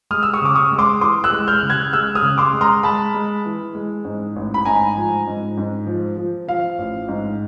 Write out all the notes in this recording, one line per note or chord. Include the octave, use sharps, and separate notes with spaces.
G#3 D#6 F6
E6
C#6 D#6
C#3 D6
C#6 D#6
G#3
C6 D6
E3 C6 D6
E6 F#6
G#3
F6 G6
C#3
F#6 G#6
G#3 E6 F#6
D#6 F6
C#3
C6 D6
G#3
A#5 C6
G#3 A5 B5
G#3
E3
G#3
G#2
A1
B5
G#2 G#5 A#5
F3
G#2
G#2
F3
F3
F3 F5
A1
G#2